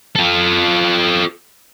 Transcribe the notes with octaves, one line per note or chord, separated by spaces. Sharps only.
F4 A4